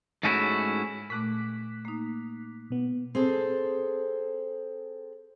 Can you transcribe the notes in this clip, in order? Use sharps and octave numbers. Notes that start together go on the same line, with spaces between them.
G#2 A3 C#4 D#4 E4 F#4
A#2 A3 D6 F#6 B6
A#3 D#4
B2 B3
C4 G#4 A4